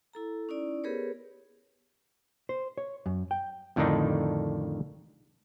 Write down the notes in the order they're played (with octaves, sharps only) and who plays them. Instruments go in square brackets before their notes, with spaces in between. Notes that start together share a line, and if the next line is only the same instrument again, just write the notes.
[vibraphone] E4 A4 A#5
C#4 D#4 E4 D5
B3 G4 G#4 A#4 B4 C#5
[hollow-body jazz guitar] C5
C#5
F#2
G5
[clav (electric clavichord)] F2 A2 D3 D#3 D4 D#4